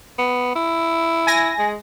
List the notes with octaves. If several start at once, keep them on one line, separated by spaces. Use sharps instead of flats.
B3
E4
G#5 A#6
G#3